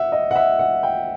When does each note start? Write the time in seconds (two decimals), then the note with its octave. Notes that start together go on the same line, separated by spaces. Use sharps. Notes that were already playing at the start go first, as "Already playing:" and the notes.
Already playing: E5 F#5
0.12 D#5
0.31 F#5
0.36 E5
0.59 F#5
0.83 G5